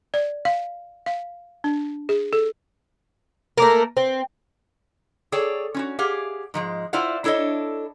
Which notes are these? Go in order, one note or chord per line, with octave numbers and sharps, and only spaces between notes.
D5
F5
F5
D4
G#4
A4
A3 A#3 A#4
C4
G#4 A4 C#5 D5 G5
C#4 F4 F#4
G4 G#4 F5 F#5
G#2 F3 G#3
E4 F4 C5 D5 F5 F#5
D4 E4 A4 C#5 D#5